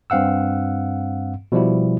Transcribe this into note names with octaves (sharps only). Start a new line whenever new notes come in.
G2 C4 F5 F#5 E6
B2 F3 G3 E4